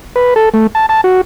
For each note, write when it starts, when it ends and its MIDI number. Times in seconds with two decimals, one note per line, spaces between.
0.16 0.34 71
0.36 0.49 69
0.54 0.67 57
0.75 0.86 81
0.89 1.01 81
1.04 1.21 66